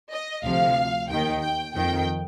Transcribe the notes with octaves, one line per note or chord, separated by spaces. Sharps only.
D#5
D2 C3 F3 F5
D#2 D#3 G5
G5
F2 D#3 G5